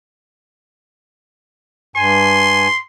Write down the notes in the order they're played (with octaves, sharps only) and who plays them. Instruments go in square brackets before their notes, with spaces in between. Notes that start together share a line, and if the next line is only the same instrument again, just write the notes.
[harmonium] G2 G#5 [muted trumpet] C6